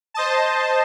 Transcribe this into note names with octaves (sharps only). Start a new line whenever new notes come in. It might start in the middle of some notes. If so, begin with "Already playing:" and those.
C5 D#5 A5